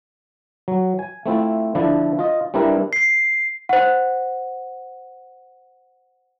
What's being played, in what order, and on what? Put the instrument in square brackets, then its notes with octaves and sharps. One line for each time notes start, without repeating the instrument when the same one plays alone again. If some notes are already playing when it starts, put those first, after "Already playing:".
[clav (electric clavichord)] F#3
G#5
A3 C4 E4 F4
D3 F3 D4 E4
F4 D#5
G3 C4 D4 E4 A#4 B4
[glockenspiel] C7
[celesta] C5 F#5